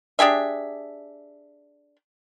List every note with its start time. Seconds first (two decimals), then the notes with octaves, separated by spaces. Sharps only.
0.19 D4 G4 G#4 E5